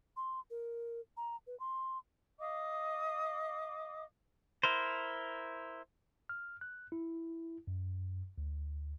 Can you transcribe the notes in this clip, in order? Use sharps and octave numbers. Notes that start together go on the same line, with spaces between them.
C6
A#4
A#5
B4
C6
D#5 F5 D6 D#6
E4 A#4 C5
F6
F#6
E4
F#2
D2